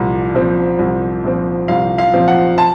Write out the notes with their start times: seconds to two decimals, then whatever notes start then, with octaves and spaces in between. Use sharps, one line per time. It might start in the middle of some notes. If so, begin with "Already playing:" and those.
Already playing: C2 A#2 F3
0.34 A#2 F3 C4
0.79 C2
1.24 A#2 F3 C4
1.68 C2 F5
1.98 F5
2.13 A#2 F3 C4
2.28 F#5
2.58 A5